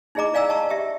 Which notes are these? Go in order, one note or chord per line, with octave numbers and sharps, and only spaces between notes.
D#4 E4 G#4 D#5 A#5 D6
D5 F5 G#5 A#5 E6
D#5 A5 C#6
G4 E5